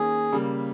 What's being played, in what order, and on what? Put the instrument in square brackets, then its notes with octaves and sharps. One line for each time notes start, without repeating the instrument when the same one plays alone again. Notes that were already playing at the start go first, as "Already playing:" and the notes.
Already playing: [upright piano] D#3 A#3 C#4 [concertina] G#4
[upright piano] C#3 G3 A#3